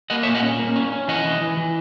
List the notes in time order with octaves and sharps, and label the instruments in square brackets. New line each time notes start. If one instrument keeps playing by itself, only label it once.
[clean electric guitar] A#3 D#5 F#5
C#5 E5
A#2
D#5 F#5
C#4
A#3
C#4
C#4
E3 D#5 F#5
E3
E3
E3